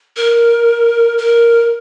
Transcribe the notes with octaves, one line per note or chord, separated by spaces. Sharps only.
A#4
A#4